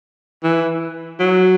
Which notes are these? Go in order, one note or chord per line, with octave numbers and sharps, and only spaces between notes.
E3
F#3